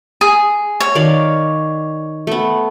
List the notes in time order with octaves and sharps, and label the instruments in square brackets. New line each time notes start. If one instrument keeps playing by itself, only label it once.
[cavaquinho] G#4
C#5
[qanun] D#3 D5 F5
A3 B3